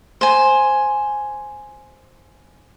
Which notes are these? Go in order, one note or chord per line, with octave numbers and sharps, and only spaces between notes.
C5 G#5